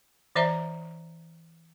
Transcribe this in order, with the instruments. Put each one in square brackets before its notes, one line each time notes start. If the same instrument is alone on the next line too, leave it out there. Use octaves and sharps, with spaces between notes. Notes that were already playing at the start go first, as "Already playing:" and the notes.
[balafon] E3 C5 D5 E5 A#5